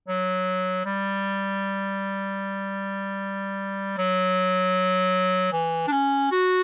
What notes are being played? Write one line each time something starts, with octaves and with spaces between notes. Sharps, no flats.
F#3
G3
F#3
E3
D4
C#4
F#4